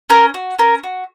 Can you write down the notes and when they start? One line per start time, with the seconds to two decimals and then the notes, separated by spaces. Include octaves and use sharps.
0.10 C#4 A#4
0.34 F#4
0.59 C#4 A#4
0.84 F#4